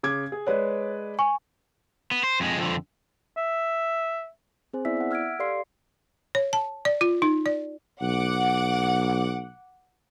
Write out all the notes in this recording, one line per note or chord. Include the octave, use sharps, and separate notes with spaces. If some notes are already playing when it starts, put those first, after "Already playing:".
C#3 D6 G#6
G#4
G#3 B4 C#5 D5
G#5 C#6
B3
C5
F2 G#3
F2 D3
E5
C4 G#4 C5 G#5
B3 E4 D5 E5 E6 B6
E5 F#5
E6 F6 G#6 B6 D7
G4 A4 D5 F5 C6 C7
C#5
A5
D5
F4
D#4
D5
B1 F#5 D6